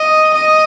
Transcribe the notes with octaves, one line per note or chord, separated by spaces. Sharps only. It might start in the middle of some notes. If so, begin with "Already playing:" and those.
Already playing: D#5
D#5